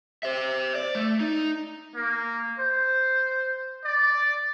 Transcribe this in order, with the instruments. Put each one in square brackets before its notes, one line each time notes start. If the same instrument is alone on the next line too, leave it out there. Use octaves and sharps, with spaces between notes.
[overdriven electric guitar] C5 E5
D5
A3
D#4
[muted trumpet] A#3
C5
D5